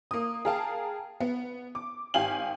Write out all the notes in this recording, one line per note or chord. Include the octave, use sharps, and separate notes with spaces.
A#3 D#6
G#4 A#4 F5 G5 A5
B3
D6
G#1 G4 F5 G#5 F#7